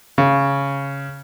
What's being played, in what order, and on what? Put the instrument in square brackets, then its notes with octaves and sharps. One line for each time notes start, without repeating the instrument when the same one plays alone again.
[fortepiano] C#3